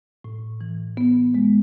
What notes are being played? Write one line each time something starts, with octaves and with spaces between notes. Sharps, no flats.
A2
E3
B3
G#3